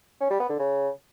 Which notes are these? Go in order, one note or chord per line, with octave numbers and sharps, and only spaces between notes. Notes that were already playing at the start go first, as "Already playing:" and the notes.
C#4
G3
B3
D3
C#3